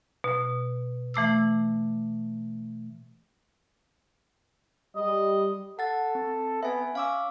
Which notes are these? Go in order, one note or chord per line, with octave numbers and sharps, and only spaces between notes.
B2
E3 A3 D6 E6
G3 G4 D#5
A4 F#5 A6
C4
B3 E5 G#5
C#4 F5 D6 E6